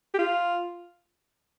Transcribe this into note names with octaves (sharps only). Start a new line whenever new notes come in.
G4
F4